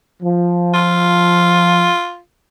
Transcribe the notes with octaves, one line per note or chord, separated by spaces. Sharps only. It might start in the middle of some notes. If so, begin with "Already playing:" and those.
F3
F4